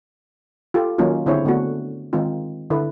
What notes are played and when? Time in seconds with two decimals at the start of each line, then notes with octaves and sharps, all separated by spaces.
0.74 F4 G4 A4
0.99 D#3 F#3 A#3 C#4 D#4 F4
1.26 D3 C4 E4 G#4 C5 C#5
1.45 D3 A3 B3 D4 F#4
2.13 D#3 G#3 C4 D#4 F4
2.70 D3 E4 A4 B4